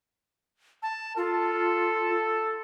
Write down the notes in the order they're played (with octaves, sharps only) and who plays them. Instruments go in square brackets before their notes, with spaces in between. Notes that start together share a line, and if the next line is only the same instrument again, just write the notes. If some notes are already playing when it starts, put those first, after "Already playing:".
[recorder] A5
[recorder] F4 [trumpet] A4